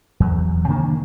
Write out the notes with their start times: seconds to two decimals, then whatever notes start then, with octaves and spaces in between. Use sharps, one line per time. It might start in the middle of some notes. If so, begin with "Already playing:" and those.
0.20 E2 F#3
0.68 C3 D#3 A#3 D4